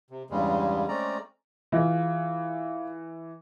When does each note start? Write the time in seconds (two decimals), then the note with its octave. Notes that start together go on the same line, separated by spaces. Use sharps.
0.10 C3
0.30 E2 G2 C#3 G3 G#3
0.88 G#3 A3 C4 C#4 D5 A#5
1.72 E3 F4 G#4